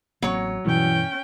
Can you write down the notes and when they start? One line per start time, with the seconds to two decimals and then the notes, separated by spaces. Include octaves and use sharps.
0.22 A1 F#3 A#3 C4 C#5
0.65 G2 B2 E3 G3 C#4 G5